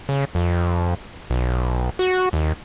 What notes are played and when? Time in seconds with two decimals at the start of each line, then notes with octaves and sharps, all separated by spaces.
0.09 C#3
0.35 F2
1.30 B1
1.99 F#4
2.33 D#2